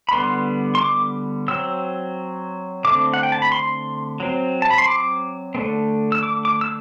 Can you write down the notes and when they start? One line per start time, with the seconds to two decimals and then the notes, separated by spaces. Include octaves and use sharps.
0.09 B5
0.13 D3 G3 B3 C6
0.75 C6
0.81 D6
1.48 F#3 C4 E6
2.85 D3 A3 C4 D6
3.14 F#5
3.23 G5
3.32 A5
3.42 B5
3.52 C6
4.20 F#3 C4
4.62 A5
4.70 B5
4.78 C6
4.88 D6
5.55 D3 A3 C4
6.12 E6
6.23 D6
6.45 D6
6.61 E6